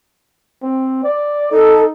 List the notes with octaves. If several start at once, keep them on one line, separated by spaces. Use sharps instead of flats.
C4
D5
D#4 A4